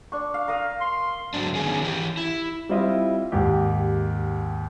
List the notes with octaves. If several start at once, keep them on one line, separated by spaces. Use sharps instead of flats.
D4 C#6
F5
A#4 F5 D#6
C6
G#2 D3 F#3 C4 D4
D#3 B3 C#4 G#4
E3 G4
E4
G3 C4 E4 F4 D#5 E5
D#2 G#2 G4